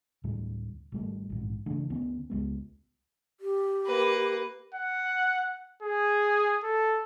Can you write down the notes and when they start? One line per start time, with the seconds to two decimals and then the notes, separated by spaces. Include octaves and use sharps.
0.24 D2 A2 D3 G3
0.92 G#1 G3 A3
1.30 A#1 G#2
1.66 C#3 E3 A3 D4
1.90 D2 B3 C#4
2.30 C#2 G#3 B3
3.40 G4
3.86 A#3 B4
4.74 F#5
5.82 G#4
6.63 A4